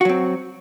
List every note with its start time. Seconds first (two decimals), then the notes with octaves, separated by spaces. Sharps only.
0.01 F#4
0.05 F#3
0.09 C4